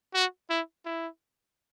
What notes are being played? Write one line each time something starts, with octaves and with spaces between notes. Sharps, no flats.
F#4
E4
E4